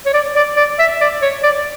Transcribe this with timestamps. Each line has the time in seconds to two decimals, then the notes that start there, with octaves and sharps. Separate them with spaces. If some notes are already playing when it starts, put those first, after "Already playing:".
0.06 C#5
0.14 D5
0.36 D5
0.57 D5
0.79 E5
1.01 D5
1.22 C#5
1.44 D5